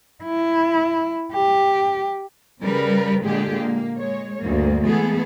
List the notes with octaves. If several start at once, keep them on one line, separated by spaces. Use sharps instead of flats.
E4
G4
C#3 G3 A#4 B4
A#2 D3 G#3 A#3 G4 G#4
A#3
G#3 C#5
D2 G2 A#3
E3 G#3 A3 B3 G#4 A4